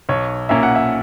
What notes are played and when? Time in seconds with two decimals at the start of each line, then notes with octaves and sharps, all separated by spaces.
0.09 B1 C#5
0.49 A#2 A#3 C#4 E5
0.63 F#5
0.76 E5